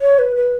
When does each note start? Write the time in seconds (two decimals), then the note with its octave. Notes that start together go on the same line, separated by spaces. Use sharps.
0.01 C#5
0.18 B4
0.36 B4